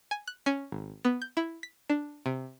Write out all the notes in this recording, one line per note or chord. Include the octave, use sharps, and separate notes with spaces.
G#5
F#6
C#4
G#1
B3
G6
E4
B6
D4
C3